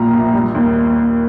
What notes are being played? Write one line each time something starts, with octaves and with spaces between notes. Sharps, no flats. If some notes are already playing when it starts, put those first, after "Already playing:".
Already playing: A#1 A#2 G3 A#5
A#1
G3
D#2